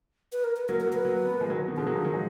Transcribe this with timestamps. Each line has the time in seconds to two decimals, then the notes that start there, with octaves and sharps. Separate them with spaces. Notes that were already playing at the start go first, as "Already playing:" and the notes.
0.32 B4
0.44 A#4
0.56 B4
0.69 F#3 A#3 A#4
0.80 A#4
0.87 F#3 A#3
0.93 B4
1.05 F#3 A#3
1.25 B3
1.33 A#3
1.41 F3 G#3
1.50 D#3 F#3
1.68 B2 D#3
1.77 D3 F3 G#4
1.86 D#3 F#3
1.95 D3 F3
2.05 D#3 F#3
2.14 F3 G#3